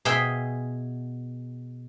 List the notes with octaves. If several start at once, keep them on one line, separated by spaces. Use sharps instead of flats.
B2 G#4 E5 G5 C6